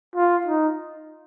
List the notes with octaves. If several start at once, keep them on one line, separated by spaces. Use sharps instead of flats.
F4
D#4